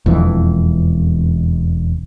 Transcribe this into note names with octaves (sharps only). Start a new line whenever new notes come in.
E1 F2 E3